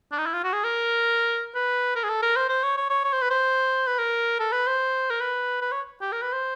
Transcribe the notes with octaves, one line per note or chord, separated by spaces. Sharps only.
D4
D#4
E4
F4
F#4
G#4
A#4
B4
A#4
G#4
A4
A#4
C5
C5
C#5
C#5
C#5
C#5
C5
B4
C5
B4
A#4
A4
B4
C5
A#4
B4
B4
C#5
G4
A#4
B4
C5